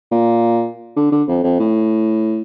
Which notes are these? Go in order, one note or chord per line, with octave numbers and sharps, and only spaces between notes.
A#2
D3
D3
F2
F2
A2